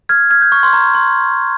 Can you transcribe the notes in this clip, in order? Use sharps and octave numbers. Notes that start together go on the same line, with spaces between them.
F6 G#6
F6 G#6
G6
C#6
C6
A#5
C6